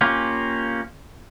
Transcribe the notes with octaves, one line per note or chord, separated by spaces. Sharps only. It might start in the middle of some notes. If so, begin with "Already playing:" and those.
A#3 C#4 F4 G4